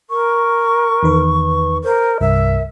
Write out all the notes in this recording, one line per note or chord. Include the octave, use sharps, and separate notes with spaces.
A#4 C#6
E2 D#3 B4
A#4 C5
C2 G2 A#4 E5